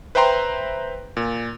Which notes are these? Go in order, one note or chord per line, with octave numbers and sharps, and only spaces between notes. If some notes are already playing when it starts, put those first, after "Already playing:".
B4 C5 E5 G5 A#5 C6
A#2